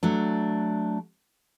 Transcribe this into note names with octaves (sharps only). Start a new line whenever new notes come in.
F#3 A3 D4